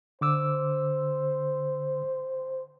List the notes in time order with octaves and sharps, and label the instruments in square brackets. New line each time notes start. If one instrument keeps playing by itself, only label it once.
[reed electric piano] D3 D6 E6 [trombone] C5